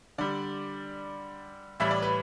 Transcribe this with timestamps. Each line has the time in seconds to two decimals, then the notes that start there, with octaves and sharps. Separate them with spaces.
0.18 D3 G3 D5
1.80 A2 E3 G3 E5
1.91 D5
2.02 B4